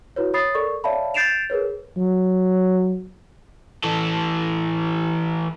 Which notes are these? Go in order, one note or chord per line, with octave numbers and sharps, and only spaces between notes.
E4 F#4 B4 C#5
C#5 B5 D#6 A6 C7
A4 A#4 D5 C#6
C#5 D5 E5 F5 A5 B5
G6 A6 C7 D7 E7 F7
G#4 A#4 B4 C#5
F#3
E3 A4